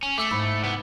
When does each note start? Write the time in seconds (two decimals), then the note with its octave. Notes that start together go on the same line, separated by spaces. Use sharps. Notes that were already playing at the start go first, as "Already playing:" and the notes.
0.03 C#4
0.18 A3 D6 E6 C#7
0.31 G#2 E4 B5 E6
0.62 C2 B3